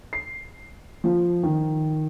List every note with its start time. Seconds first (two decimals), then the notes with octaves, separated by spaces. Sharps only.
0.13 C7
1.04 F3
1.43 D#3